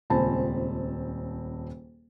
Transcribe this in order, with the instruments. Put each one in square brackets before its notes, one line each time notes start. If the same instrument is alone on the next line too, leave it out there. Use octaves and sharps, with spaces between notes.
[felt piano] D#1 C#2 C4 G#5 A5 B5